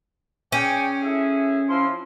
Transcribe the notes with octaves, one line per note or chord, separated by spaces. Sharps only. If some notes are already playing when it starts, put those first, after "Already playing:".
C#4 G#4 D5 G5
A2 G#4 E5
F3 E4 C6